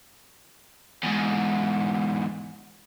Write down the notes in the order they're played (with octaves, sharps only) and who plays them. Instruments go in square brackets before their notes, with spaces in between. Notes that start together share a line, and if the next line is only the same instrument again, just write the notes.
[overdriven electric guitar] E2 G#2